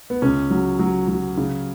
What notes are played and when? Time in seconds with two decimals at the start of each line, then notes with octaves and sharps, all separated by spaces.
0.10 B3
0.22 C#2 C#4
0.51 F#3
0.79 F#3
1.08 F#3
1.37 C#3